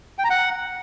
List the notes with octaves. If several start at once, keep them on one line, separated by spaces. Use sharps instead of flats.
G5
A#5
F#5